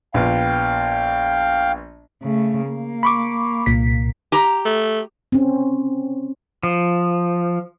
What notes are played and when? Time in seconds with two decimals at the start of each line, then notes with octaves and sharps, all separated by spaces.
0.14 A#1 B3 F4 F5 G5
2.22 C#3 A3
2.68 A#3
3.03 B5 C#6 D6
3.66 C2 A#2 B6
4.32 G4 A#5
4.65 A3
5.32 C4 C#4
6.63 F3